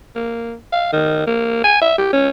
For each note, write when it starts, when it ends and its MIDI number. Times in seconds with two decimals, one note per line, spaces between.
0.16 0.55 58
0.73 0.91 77
0.93 1.23 51
1.27 1.61 58
1.64 1.81 80
1.82 1.95 76
1.98 2.09 67
2.13 2.29 61